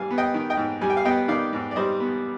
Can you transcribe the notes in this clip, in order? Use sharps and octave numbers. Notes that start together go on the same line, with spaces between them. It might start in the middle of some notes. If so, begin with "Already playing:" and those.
Already playing: G#2 G3 F5 G#5
B3
D#5 G5
D#3
D#5 G5
G#2
G3 G#5
G5
F5
B3 D#5 G5
D#3 D5 F5
G#2
D5
G3 C5 D#5
B3